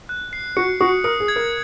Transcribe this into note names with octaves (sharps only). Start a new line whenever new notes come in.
F#6
C7
F#4 C#7
F#4 D#6
A#4 D#6
G#4
G#6
A#4